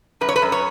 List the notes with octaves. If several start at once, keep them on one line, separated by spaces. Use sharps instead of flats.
F#2 B4
C#5
B4
F#2
C#5